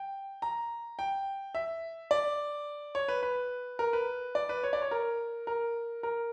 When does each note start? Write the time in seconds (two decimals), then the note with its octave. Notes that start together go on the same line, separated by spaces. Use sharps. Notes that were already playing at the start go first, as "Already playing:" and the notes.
Already playing: G5
0.42 A#5
0.99 G5
1.55 E5
2.11 D5
2.95 C#5
3.08 B4
3.23 B4
3.79 A#4
3.93 B4
4.35 D5
4.49 B4
4.63 C#5
4.73 D5
4.82 C#5
4.91 A#4
5.47 A#4
6.03 A#4